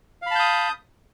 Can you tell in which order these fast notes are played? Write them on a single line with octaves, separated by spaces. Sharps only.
F5 B5 A5 G6 D#6